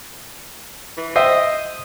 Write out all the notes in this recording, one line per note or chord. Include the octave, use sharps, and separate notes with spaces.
E3
C5 D#5 E5 G5